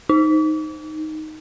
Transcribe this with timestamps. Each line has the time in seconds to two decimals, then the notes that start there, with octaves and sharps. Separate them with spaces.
0.09 D#4